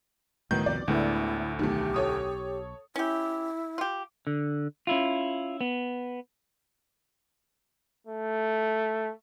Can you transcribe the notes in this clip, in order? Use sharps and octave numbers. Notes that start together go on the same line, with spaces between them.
C#2 A2 D#3 F#3 B3 D#4 G6
C2 F2 B2 D5
D2 A2 D3 G#3 B3 E4
B1 D#3 A3 G4
A4 C#5 D#6
C#4 E4 G4
F4 G4
D3
C#4 E4 F4
B3
A3